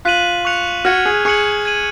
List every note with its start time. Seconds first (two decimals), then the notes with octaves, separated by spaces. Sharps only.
0.05 F4 F#6 B6 D#7 F#7
0.45 C#6 F#6 C#7 F7
0.85 F#4 F6 G#6 C#7
1.06 G#4
1.25 G#4 C#6 F#6 C#7 F#7
1.65 G#6 D#7 F#7